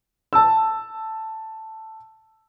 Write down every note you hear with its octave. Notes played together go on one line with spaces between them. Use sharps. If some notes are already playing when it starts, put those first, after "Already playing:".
A5 E6